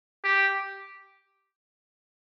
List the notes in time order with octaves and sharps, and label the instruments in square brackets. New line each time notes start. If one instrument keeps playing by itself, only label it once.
[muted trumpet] G4